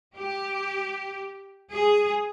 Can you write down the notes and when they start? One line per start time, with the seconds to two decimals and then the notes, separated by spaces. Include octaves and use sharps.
0.16 G4
1.72 G#4